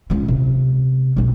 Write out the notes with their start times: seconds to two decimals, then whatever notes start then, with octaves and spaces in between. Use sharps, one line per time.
0.10 C#2 C#3
0.28 C3
1.16 B1 C4